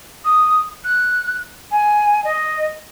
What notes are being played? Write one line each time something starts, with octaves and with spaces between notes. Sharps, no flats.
D#6
F#6
G#5
D#5